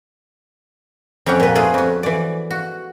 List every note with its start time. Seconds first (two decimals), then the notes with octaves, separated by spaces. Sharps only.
1.26 F2 C#4 G4 F#5
1.40 A#2 B4
1.55 A3 B3 D4 F4 G#4
1.74 F2 F#4
2.03 E3 D5
2.51 F#4